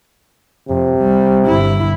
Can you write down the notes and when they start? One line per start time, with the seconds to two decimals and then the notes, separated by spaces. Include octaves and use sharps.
0.69 F2 C3
0.98 G3
1.45 G1 E4